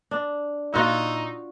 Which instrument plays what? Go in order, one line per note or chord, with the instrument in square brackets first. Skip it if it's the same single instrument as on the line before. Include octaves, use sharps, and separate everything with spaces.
[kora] D4
[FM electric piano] A#2 E6 [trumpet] D#4 [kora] F4 F#4